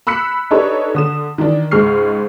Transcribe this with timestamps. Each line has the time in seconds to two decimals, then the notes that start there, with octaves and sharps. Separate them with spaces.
0.07 B5 E6 F#6 B6 C#7
0.51 D4 D#4 G4 A4 B4 C#5
0.95 D3 D#6 E7
1.38 D#3 E3 D4
1.71 C#2 G#2 C#6 F6 C7